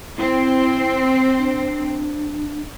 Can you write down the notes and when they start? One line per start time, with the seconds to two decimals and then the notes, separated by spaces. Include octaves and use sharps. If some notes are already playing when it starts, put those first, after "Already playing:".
0.17 C4 E4
1.38 D4